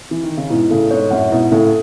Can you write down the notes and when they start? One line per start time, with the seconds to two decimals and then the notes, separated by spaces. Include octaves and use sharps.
0.11 E3
0.23 D#3
0.37 C#3
0.49 G#2 B2 E4
0.70 A2 C#3 A4
0.91 G#2 B2 C#5
1.11 F#2 A2 F#5
1.31 G#2 B2 E4
1.43 B2
1.51 A2 C#3 A4